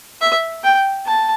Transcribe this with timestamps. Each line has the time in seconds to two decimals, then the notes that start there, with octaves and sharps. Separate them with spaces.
0.21 E5
0.64 G5
1.06 A5